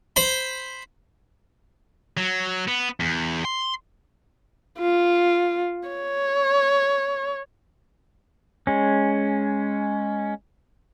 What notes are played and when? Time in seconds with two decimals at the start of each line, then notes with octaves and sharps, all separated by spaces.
0.16 C5 B5
2.17 F#3
2.68 B3
3.00 E2
3.45 C6
4.79 F4
5.88 C#5
8.67 G#3 C#4